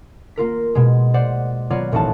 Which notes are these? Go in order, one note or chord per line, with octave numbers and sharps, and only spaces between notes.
A#3 F4 A#4 B6
B2 G#3
C5 D5 F#5
F#3 B3 F4 C#5 D5 F6
D#1 A1 D#4 F#4 A5